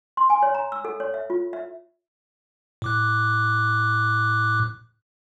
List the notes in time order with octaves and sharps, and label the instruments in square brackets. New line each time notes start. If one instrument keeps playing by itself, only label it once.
[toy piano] C6
G#5
C#5
A#5
E6
A4
C#5
E5
F4
E5
[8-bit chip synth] A2 D6 F#6